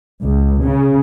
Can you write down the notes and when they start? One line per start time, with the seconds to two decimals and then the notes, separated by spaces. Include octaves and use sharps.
0.23 C#2
0.63 C#3